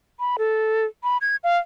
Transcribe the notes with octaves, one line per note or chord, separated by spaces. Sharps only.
B5
A4
B5
G#6
F5